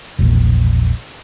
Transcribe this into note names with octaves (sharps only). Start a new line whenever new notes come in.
E1 A#1